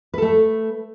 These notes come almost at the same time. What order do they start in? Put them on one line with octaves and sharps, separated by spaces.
B4 A4 A3